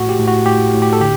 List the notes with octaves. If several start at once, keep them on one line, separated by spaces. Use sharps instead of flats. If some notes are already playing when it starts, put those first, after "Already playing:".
Already playing: A2 A3 F#4
G4
A2
F#4
A2 G4
A2
G4
A4
D3 G4